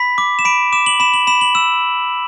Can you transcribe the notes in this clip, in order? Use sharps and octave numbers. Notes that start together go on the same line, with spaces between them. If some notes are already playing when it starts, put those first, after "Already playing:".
Already playing: B5 B6
D6
E7
B5 D7
D6 E7
F#7
B5 E7
F#7
B5 E7
F#7
E6 E7